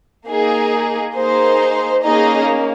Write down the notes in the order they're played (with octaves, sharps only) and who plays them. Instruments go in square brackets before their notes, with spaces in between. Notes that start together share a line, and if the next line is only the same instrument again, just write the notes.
[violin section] A#3 D#4 G#4
A#3 D#4 G#4 C5
A#3 C#4 D#4 G#4 D#5